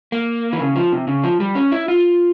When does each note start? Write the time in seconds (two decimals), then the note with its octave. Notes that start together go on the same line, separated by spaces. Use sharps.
0.12 A#3
0.53 E3
0.61 C#3
0.76 F3
0.92 C3
1.08 C#3
1.23 F3
1.40 G3
1.55 C#4
1.72 E4
1.88 F4